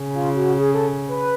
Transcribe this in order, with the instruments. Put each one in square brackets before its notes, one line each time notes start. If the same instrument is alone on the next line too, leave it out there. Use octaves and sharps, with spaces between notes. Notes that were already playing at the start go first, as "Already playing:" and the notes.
Already playing: [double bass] C#3
[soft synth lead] F4
F#4
G#4
A4
B4